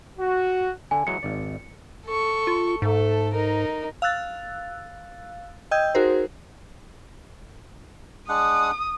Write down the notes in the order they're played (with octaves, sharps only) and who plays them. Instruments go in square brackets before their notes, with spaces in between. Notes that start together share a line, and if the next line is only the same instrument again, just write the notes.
[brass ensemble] F#4
[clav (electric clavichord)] D3 [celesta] G#5
[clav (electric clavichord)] E3 F#3 G#3 [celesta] C#7
[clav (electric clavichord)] G#1 D5
[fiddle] A4 C#6
[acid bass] F4
[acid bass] G#2 [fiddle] A3 A4
[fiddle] D#4 A#4
[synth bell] F5 E6 F#6 A6
D#5 G5 E6 G6 G#6
D#4 F#4 G#4 A#4 C5
[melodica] G#3 D4 F#5 [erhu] D#6